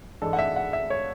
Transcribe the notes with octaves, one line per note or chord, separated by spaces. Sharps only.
G#2 E3 G#3 D4 A4
F#5
E5
F#5
E5
C#5